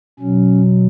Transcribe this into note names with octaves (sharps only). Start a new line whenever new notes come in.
B2 F#3 C#4